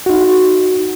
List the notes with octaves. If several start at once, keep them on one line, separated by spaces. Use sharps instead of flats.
D#4 F#4